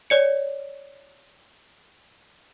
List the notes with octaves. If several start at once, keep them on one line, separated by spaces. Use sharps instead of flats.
C#5 D5 C#7